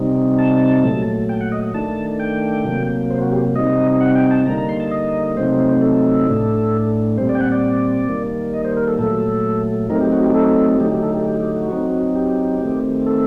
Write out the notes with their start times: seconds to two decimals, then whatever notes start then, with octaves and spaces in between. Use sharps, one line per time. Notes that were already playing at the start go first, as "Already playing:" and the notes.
Already playing: C3 G3 C4 D#4
0.39 A5
0.84 A#2 F#3 A3
1.29 G5
1.41 F#5
1.52 D#5
1.74 D#3 A3 D4 A5
2.20 G5
2.65 C3 F#3 A#3
3.10 C5
3.21 F#4
3.33 G4
3.55 C3 G3 C4 D#4 D#5
4.01 F#5
4.15 G5
4.31 A5
4.46 D3 G3 A#3 D#4 A#5
4.58 A#5
4.69 C6
4.80 A5
4.91 D#5
5.37 C3 F#3 A3 C4 D#4 C5
5.82 A4
6.27 A2 A3 D4
7.18 A#2 G3 C4 C5
7.29 D5
7.35 G5
7.40 F#5
7.52 D5
8.09 D#3 G3 A#3
8.54 D#5
8.65 C5
8.77 A#4
8.88 A4
8.99 A#2 F#3 A3 A4
9.89 F#3 A3 C4 D#4 A#4
10.01 G4
10.12 F#4
10.24 G4
10.35 A4
10.80 D3 F#3 A3 D#4 G4
10.92 G4
11.03 A4
11.14 G4
11.26 G4
11.40 G4
11.56 F#4
11.71 F#3 C4 D#4
12.16 G4
12.61 D#3 A3 C4
13.07 A4